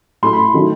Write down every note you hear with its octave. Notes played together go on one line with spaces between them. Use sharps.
A2 F#3 A3 C6
B5
D#3 F#3 A3